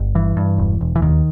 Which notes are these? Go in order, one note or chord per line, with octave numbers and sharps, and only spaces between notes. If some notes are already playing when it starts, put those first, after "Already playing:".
Already playing: G1
G2 E3
G2
E1
E1
E3
D#2 D#3